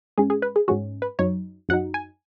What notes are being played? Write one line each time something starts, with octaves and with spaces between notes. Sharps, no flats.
G#2 G#3 C#4 G#4
G#4
B4
G#4
G#2 G#3 C#4 F#4
B4
F#2 F#3 D#4 C#5
F#2 F#3 D#4 F#5
G#5